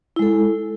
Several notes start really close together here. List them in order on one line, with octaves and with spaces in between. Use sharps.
E4 G#3 A4